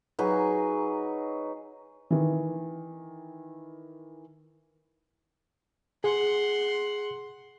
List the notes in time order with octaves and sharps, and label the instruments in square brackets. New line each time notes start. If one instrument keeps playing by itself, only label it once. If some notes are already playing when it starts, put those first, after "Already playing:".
[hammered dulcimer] F#3 D#4 G#4 B4
[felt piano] D#3 E3
[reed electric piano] G#4 [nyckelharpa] F#5 C6